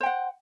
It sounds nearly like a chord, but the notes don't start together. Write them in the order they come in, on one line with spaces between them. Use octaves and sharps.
C5 G5 F#5